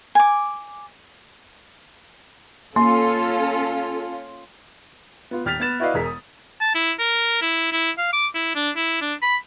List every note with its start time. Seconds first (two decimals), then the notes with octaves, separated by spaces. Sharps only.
0.15 G#5 D6
2.76 A#3 C#4 F4 A4 C6
5.31 B3 F4
5.45 D#1 G4 F6 A6 B6 F7
5.60 B3 B4 A6 E7
5.80 E4 F#4 B4 D5 D#5 F5
5.94 E1 G#4 A#4 B6
6.06 D#6
6.61 A5
6.75 E4
6.99 A#4
7.42 E4
7.72 E4
7.98 F5
8.13 D6
8.35 E4
8.55 D4
8.76 E4
9.01 D4
9.22 B5